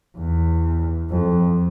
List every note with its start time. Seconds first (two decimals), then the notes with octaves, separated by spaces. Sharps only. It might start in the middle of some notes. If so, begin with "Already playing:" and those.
0.18 E2
1.10 F2